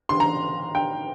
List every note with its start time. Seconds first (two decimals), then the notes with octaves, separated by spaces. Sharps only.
0.09 C6
0.20 A#5
0.75 G5